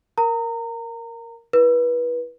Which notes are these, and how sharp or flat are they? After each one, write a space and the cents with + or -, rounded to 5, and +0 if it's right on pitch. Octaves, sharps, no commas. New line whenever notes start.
A#4 +0 A#5 -25
E4 +0 B4 -25